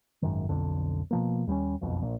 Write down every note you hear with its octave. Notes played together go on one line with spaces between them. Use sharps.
G#1 F#2 D#3
B1 F2 D3
B2 F3 A#3
D#2 G3 C4 C#4
F#1 B1 F2 B2
A#1 A#2